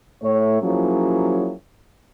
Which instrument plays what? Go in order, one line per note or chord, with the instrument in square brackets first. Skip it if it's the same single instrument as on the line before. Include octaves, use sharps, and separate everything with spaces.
[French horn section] A2 A3 C#5
F3 F#3 A#3 C#4 E4 G#4